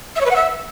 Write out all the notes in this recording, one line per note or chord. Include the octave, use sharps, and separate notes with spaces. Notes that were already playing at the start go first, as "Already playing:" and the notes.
E5
C#5
B4
F#5
E5